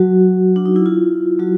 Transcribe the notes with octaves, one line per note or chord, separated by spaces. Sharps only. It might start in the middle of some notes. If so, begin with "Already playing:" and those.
Already playing: F#3 F#4
D4
D#4
E4
F4
F#3 F#4